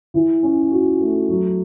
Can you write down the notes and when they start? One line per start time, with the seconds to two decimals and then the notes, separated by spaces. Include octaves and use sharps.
0.14 E3
0.43 C#4
0.71 F#4
1.01 A3
1.29 F#3